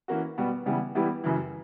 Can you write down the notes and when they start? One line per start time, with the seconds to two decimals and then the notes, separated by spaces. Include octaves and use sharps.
0.08 E3 A#3 C#4 F#4
0.38 B2 G3 B3 F#4
0.66 C#3 E3 G3 B3 E4
0.95 E3 G3 B3 E4 G4
1.24 F#2 C#3 E3